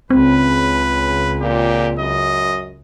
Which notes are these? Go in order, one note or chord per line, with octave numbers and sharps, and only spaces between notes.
C#2 C#3 C4 B4
A#2 G4
F#2 D#5